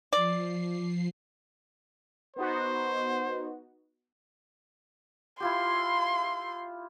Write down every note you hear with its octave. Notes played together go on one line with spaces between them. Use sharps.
F3 D5 C7
B3 D#4 F#4 C5
E4 F4 G4 C6